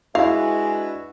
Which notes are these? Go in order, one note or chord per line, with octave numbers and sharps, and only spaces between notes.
G#3 D4 E4 F#4 B4 F5